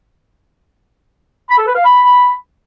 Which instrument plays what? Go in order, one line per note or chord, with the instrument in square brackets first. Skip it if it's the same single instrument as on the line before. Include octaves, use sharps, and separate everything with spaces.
[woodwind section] B5
A4
B4
F5
B5